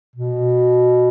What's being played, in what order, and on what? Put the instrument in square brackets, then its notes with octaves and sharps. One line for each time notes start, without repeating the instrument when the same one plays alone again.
[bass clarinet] B2